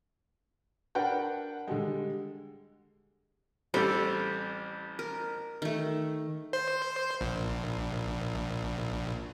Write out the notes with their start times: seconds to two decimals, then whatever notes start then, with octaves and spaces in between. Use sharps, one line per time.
0.95 D4 A#4 B4 F#5 G5
1.68 D3 G3 G#3
3.74 A1 G3 C4 A4
4.99 A#4
5.62 D#3 A3
6.53 C5
7.21 A#1